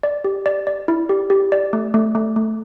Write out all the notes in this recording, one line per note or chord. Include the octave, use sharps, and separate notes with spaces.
D5
G4
D5
D5
E4
G4
G4
D5
A3
A3
A3
A3